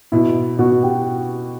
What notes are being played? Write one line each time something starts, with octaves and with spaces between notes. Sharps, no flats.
B2 E4
B2 F#4
G4